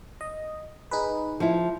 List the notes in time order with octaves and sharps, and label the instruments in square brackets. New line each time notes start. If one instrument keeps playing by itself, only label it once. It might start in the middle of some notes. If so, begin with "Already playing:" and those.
[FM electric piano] D#5
D#4 G#4 B4
[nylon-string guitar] F3 E4